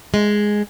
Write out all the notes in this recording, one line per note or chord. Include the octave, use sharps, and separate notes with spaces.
G#3